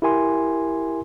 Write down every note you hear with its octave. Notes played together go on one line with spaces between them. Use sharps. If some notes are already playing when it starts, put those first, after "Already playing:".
E4 G4 A#4 G#5 C6